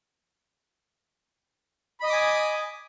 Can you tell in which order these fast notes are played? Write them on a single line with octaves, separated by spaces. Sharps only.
B5 D#5 D#6 D6 G#5